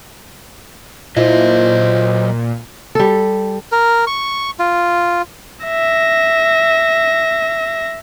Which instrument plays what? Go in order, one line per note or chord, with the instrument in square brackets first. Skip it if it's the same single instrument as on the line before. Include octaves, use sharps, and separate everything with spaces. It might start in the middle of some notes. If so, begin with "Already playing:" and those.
[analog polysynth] A#2 [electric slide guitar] F#3 D#5 [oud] E4 F4 [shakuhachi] C5
[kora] G3 A4
[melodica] A#4
C#6
F4
[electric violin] E5 A#6